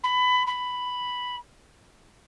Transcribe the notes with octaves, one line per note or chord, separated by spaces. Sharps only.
B5
B5